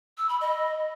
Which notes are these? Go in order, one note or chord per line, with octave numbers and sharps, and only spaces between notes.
E6
B5
D#5